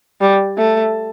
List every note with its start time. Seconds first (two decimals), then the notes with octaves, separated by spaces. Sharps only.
0.21 G3
0.57 A3